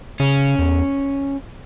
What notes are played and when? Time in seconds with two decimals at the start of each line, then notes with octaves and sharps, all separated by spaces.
0.20 C#3 C#4
0.59 E2